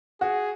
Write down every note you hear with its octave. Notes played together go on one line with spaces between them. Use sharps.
F#4 G#4